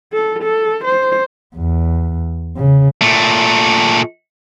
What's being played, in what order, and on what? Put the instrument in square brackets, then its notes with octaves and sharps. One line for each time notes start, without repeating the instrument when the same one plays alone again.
[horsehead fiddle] A4
A4
C5
[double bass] E2
C#3
[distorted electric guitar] A#2 A3